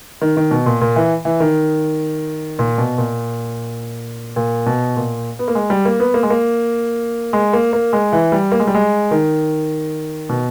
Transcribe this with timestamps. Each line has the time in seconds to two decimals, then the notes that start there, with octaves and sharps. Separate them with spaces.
0.22 D#3
0.37 D#3
0.51 B2
0.66 A#2
0.81 A#2
0.96 E3
1.25 E3
1.40 D#3
2.59 A#2
2.78 B2
2.98 A#2
4.36 A#2
4.66 B2
4.96 A#2
5.39 B3
5.48 A#3
5.55 G#3
5.70 G3
5.85 A#3
6.00 B3
6.14 A#3
6.23 G#3
6.30 A#3
7.33 G#3
7.53 A#3
7.73 A#3
7.93 G#3
8.13 E3
8.32 G3
8.52 A#3
8.60 G#3
8.67 G3
8.74 G#3
9.11 D#3
10.29 B2